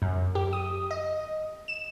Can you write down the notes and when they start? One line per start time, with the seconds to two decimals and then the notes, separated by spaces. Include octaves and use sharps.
0.02 F#2
0.35 G4
0.53 D#6
0.91 D#5
1.68 E7